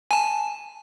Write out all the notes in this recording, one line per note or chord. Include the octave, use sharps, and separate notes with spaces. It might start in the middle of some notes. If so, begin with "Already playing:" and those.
G#5 A5